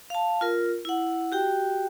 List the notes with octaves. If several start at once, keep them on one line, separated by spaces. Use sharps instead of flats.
F5 A5
F4 A#4
E4 F#5
F#4 G4 G5